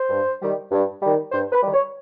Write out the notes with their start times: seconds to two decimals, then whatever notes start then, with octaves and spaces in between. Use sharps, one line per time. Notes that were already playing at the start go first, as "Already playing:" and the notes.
Already playing: C5
0.09 G2
0.41 D#3 G3
0.72 G2
1.01 D#3 G3
1.32 G2 C5
1.52 B4
1.63 D#3 G3
1.74 C#5